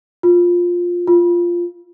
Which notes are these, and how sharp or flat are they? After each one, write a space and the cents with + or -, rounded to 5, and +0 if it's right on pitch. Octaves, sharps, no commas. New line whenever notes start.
F4 +10
F4 -5